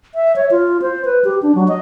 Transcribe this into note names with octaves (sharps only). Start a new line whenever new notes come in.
E5
C#5
F4
C5
B4
G4
D4
F#3
D#5